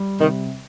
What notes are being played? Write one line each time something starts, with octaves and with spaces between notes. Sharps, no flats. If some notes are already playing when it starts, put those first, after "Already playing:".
Already playing: G3
C3 D#3